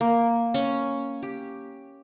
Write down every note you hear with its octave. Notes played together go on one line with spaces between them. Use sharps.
A#3
C#4
G4